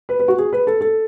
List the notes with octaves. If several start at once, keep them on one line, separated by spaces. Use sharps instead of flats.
B4
B4
F#4
G#4
B4
A4
A4